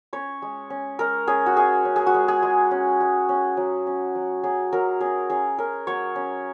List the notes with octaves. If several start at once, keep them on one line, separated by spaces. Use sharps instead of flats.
C#4 C#5
G#3
C#4
G#3 A#4
C#4 G#4
F#4
G#3 G#4
C#4
G#4
F#4
G#3
G#4
G#3
C#4
G#3
C#4
F#3
C#4
F#3
F#3 G#4
F#3 A#4
C#4 G#4
C#4 G#4
C#4 A#4
F#3 C#5
C#4